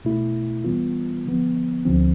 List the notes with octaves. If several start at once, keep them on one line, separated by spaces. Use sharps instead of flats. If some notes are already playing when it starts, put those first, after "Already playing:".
B2 A3 E4
E3 G3 B3 F4
D3 F3 B3
D2 D3 F3 C4